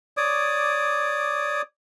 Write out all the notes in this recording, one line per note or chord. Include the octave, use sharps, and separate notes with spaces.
C#5 D5 D6 D#6